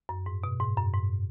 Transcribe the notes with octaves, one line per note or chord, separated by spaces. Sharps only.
F#2
G#2
B2
G#2
F#2
G#2